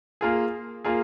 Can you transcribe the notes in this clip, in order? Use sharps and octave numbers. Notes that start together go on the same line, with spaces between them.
A#3 F4 G#4
A#3 F4 G#4